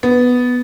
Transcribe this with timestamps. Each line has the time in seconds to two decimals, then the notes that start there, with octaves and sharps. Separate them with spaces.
0.03 B3